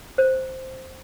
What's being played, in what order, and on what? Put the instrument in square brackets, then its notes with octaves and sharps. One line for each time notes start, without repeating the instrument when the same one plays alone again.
[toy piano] C5